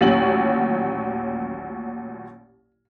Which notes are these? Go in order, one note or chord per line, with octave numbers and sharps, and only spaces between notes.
A1 D#2 A#2 F#3 C#4 F#7